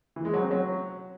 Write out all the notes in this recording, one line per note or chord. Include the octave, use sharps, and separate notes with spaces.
E3
G#3
F#3
C4
F#3